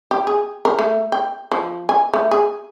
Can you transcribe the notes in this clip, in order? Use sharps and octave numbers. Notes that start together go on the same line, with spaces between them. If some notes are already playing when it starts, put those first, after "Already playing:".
G4
G#4
A#4
A3
G5
F3
G#5
A3
G#4